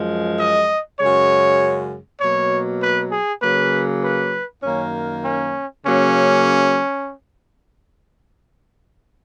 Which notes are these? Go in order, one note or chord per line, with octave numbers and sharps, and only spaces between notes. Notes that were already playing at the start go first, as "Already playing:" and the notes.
Already playing: F#2 F3 G#3
D#5
F#2 C#3 G#3 C#5
B2 F#3 A#3 C#5
B4
G#4
C#3 F#3 A#3 B4
B4
F#2 D#3 A#3 C#4
C#4
C#3 F#3 A#3 C#4